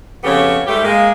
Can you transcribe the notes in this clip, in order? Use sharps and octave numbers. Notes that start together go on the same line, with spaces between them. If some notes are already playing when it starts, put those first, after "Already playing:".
F2 C#3 B3 G4 A4 C#5
G#2 G3 A3 G4
G#3 A#3 G#4